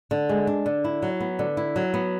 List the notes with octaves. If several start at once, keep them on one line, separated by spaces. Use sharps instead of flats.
D3
G#3
D4
D3
E4
F#3
B3
D3
E4
F#3
B3